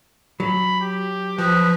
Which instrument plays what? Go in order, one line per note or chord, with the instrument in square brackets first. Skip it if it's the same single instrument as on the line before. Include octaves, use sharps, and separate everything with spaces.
[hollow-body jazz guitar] F#3 [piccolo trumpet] B5
[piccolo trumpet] G4
[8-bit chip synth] F3 [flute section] B4 D#6 F#6